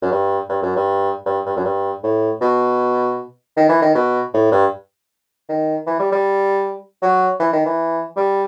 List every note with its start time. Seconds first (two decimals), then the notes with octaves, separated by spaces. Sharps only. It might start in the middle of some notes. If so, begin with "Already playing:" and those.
0.02 F#2
0.12 G2
0.49 G2
0.62 F#2
0.75 G2
1.26 G2
1.46 G2
1.57 F#2
1.65 G2
2.03 A2
2.41 B2
3.57 D#3
3.69 E3
3.82 D#3
3.95 B2
4.34 A2
4.52 G2
5.49 D#3
5.87 E3
5.99 G3
6.12 G3
7.02 F#3
7.40 E3
7.53 D#3
7.66 E3
8.17 G3